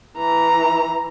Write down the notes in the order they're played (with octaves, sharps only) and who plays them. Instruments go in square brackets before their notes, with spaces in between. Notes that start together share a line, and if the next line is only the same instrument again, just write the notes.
[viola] E3 A#5